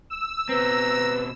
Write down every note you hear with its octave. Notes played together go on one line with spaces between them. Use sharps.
E6
B2 C4 B4 A#5